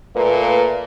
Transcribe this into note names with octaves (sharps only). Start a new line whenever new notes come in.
A#2 A3 A#3 B4